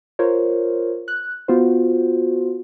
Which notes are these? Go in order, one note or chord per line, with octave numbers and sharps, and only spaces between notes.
F4 A#4 C5 C#5
F#6
B3 F4 F#4 C5